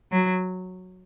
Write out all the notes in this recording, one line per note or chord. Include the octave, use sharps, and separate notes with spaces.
F#3